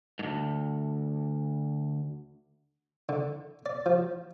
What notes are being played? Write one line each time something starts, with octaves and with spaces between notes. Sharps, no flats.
D2 G#2
D3
D5
F3